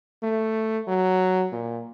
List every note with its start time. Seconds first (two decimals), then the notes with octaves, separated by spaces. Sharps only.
0.23 A3
0.88 F#3
1.52 A#2